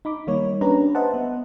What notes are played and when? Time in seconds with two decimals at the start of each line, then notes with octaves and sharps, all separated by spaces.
0.05 D#4 B5 D6
0.27 D#3 G3 A#3 D#4 C#5
0.61 C#4 D4 G4 B4 A#5
0.95 B4 C5 D#5 E5 F#5 A5
1.14 B3